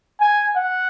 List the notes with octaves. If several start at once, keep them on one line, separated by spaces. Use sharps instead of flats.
G#5
F#5